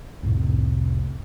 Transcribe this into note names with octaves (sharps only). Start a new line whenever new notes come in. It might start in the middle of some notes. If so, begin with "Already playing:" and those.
C2 F2 A2 C3